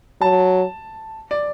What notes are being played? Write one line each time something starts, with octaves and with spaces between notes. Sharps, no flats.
F#3 A5
D5